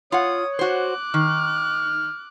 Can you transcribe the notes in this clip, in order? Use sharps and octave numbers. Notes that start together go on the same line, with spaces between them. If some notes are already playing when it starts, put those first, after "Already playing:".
F4 C#5 F#5 D#6
F#4 C5 D6 F#6
D#3 F6